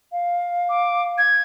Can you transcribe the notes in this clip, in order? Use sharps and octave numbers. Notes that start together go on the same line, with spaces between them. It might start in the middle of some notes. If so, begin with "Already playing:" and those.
F5
D6
G#6